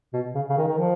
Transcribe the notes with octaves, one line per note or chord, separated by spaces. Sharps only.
B2
C#3
C#3
D#3
D#3
F3